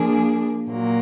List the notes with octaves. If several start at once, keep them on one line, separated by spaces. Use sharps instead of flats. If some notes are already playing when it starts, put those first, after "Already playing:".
Already playing: F3 A#3 D4 G#4
A#2 F#3 A#3